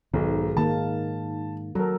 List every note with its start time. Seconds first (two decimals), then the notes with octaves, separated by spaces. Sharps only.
0.14 B1 G#2 D#3
0.57 D#3 A#3 A5
1.75 F#3 A4 A#4